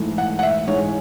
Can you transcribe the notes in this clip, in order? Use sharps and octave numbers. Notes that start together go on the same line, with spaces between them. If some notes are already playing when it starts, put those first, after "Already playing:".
Already playing: G#2 E3 A3
F#5
F#5
E5
G#2 E3 G#3 C#5